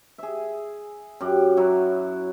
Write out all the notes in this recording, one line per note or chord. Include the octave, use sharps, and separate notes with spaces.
G#4 E5
F#2 G4
F#3 E4 F#4